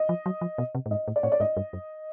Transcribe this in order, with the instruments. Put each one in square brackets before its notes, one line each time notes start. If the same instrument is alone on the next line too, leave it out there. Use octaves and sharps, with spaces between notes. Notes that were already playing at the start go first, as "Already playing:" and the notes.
Already playing: [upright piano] D#5
[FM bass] F3
F#3
F3
B2
C3
A2
[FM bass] G#2 [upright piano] D#5
[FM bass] A2
[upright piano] D5
[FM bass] A2 [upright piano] C#5
[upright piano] D5
[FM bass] G#2 [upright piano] D#5
[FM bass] G2
F#2